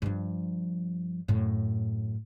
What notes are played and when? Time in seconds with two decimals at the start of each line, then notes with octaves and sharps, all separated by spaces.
0.02 G2 F3
1.28 F#2 A2